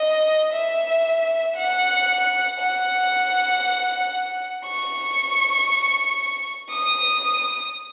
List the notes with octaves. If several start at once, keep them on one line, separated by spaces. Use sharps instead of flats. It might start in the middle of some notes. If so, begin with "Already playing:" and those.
Already playing: D#5
E5
F#5
F#5
C#6
D#6